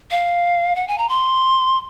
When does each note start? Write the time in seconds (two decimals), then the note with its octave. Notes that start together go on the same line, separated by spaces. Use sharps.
0.11 F5
0.76 F#5
0.88 G#5
0.98 A#5
1.09 C6